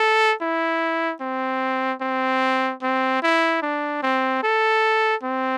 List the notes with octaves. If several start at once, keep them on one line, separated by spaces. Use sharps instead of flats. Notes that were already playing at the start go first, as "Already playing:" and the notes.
Already playing: A4
E4
C4
C4
C4
E4
D4
C4
A4
C4